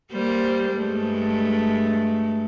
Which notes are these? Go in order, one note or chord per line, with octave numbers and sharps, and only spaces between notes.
G3 A#3 C5
G2 G#3 A3